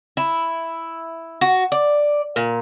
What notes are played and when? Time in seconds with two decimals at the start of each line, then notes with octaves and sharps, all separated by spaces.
0.17 E4
1.41 F#4
1.72 D5
2.36 A#2